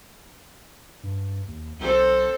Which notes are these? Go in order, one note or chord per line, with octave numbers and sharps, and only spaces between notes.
G2
D#2
B1 C4 A4 C5